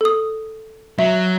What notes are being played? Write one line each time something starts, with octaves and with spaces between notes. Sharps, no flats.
A4 D#6
F#3 E5